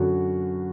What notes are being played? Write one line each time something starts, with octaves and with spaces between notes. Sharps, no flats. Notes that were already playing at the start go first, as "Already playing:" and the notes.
Already playing: F#2 D3 F#3 F#4